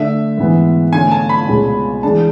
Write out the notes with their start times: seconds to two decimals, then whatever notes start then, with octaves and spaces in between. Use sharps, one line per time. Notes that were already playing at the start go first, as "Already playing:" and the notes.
Already playing: D3 A3 D4 E5
0.37 G#2 E3 B3
0.93 D3 A3 C#4 G#5
1.11 A5
1.29 B5
1.48 C#2 B2 G#3 C#4
2.03 E3 G#3 D4 G#4 A5